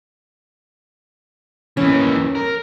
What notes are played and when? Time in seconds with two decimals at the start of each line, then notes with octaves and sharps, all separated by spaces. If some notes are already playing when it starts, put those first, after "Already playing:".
1.77 D#2 E3 C#4
2.35 A#4